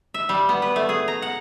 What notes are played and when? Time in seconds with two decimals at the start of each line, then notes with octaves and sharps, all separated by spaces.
0.14 E5
0.29 G3
0.49 B3
0.62 B4
0.76 A3
0.89 G#4
1.08 A#5
1.22 F#5